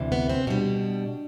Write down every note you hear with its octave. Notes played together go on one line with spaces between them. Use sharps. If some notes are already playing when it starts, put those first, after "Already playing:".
Already playing: D2 C3 E3
B3
C4
B2 G3 D4